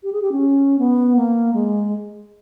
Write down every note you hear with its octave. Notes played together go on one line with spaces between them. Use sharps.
G4
G#4
G4
C#4
B3
A#3
G#3